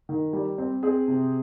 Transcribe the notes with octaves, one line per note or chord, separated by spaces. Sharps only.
D#3
G3
C4
C4 G#4
C3